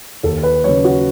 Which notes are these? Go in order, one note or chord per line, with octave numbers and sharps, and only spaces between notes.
D#2 A4
B4
C#3 F#3 C#5
F#4